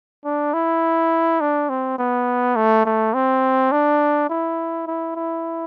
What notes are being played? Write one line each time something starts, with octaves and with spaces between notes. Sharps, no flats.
D4
E4
D4
C4
B3
A3
A3
C4
D4
E4
E4
E4